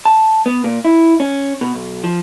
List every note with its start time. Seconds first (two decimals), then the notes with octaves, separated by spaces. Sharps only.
0.05 A5
0.46 B3
0.64 A#2
0.85 E4
1.20 C#4
1.61 B2
1.74 B1
2.04 F3